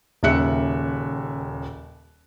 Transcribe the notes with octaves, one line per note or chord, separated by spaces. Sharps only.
D#1 D#2 C#3 E5 F#6 C#7